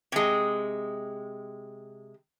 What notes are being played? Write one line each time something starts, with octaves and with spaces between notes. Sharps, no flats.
C3 G#3